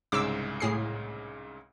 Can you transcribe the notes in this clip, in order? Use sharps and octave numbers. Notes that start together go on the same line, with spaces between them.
C2 G#2 C#3 D6 E6
A2 G#4 C7